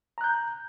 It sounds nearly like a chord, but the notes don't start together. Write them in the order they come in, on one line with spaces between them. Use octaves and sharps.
A#5 F#6 G6